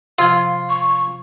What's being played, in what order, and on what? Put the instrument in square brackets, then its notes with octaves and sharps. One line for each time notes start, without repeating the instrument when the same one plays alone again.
[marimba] C3 F3 [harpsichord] F4
[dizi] C#6